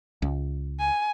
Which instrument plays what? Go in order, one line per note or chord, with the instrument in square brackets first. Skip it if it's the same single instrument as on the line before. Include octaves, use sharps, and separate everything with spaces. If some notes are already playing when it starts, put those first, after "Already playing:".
[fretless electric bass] C#2
[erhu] G#5